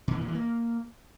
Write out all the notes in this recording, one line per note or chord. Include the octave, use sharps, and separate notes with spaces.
B2
E3
A#2
E3
A#3